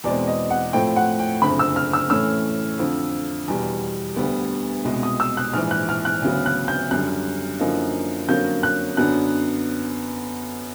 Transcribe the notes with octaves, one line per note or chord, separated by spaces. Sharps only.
E2 B2 G#3 C4 D5
D#5
F#5
A2 F3 A3 C4 G5
F#5
G5
F#1 F2 D3 B5
E6
F6
E6
A2 E3 A3 C#4 E6
F2 D3 F3
E2 B2 G3
D2 D3 G3 B3
C2 B2 G#3
D#6
E6
F#6
A#1 G#2 E3 F6
F#6
F6
F#6
D2 C#3 F#3 B3
F#6
G6
F#2 D3 G3 F#6
F#2 D3 F3 A#3 D#4
F2 D3 F#3 A#3 C#4 G6
F#6
F#2 D3 F#3 B3 D4 F#6